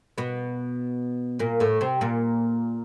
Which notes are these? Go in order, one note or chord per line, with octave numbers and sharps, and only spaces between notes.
B2 B3
A#2 A#3
A2 A3
C3 C4
A#2 A#3